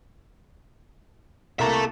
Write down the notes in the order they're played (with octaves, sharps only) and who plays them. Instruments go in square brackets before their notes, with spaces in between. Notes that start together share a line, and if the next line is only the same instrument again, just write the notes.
[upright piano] C2 A#3 A#5 [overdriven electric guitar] A4 E5